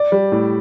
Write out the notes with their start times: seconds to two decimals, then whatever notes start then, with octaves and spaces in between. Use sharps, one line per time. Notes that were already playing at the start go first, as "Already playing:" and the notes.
Already playing: D5
0.12 G3
0.32 A2